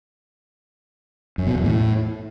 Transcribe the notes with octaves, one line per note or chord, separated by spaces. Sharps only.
F#2
B2
E2
A2